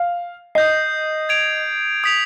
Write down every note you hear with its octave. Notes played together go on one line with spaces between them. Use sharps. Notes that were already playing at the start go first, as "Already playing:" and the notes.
Already playing: F5
D#5 D#6 G6 C7
G#6 D7 F7
D#6 B6 F7